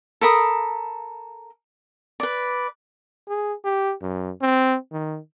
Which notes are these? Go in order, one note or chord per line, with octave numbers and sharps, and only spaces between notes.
A4 A#4 B5 D#6
B4 D5
G#4
G4
F#2
C4
D#3